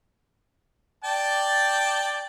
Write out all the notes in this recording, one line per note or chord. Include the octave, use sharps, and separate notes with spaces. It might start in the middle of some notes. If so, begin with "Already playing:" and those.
D5 G5 A5